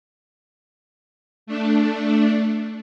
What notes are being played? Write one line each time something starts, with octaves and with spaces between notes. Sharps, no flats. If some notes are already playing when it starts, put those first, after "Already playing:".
A3 D4